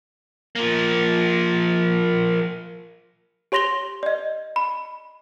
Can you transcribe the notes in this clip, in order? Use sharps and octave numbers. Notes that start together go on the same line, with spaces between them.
F3 A#3
G4 C#5 C6 A#6 F7 G7
D5 D#5
B5